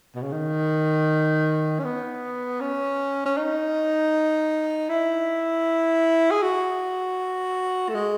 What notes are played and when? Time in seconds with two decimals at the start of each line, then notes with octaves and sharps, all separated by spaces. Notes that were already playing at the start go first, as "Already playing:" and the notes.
0.15 B2
0.22 C#3
0.33 D#3
1.80 C#4
1.84 B3
2.61 C#4
3.26 C#4
3.37 D#4
4.89 E4
6.31 G#4
6.42 F#4
7.89 A3
7.95 G#3